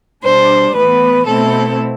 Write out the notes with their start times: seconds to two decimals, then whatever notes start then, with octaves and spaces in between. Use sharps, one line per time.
0.23 B2 G3 D4 C5
0.75 A2 E3 B3 B4
1.26 B2 A3 C4 E4 A4